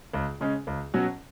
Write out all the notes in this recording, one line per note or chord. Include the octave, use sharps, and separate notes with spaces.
C#2
C#3 G#3 C#4
C#2
B2 F#3 C#4 F#4